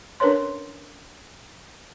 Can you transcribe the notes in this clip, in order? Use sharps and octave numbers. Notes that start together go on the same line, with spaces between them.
C#4 D4 A#4 B4 C#5 C6